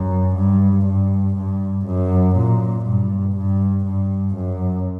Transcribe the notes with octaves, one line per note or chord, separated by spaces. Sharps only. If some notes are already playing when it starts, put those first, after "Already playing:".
Already playing: F#2
G2
G2
G2
F#2
A#2
G2
G2
G2
F#2